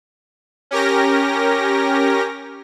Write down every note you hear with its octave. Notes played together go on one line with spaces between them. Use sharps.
C#4 G4 A#4 A#6